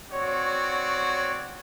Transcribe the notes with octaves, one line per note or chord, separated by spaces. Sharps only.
C4 F#4 C#5 D5